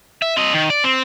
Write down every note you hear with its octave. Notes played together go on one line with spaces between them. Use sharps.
E5
C4 D#5
D#3
D5
C4